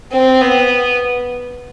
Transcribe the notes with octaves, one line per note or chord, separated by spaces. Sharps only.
C4
B3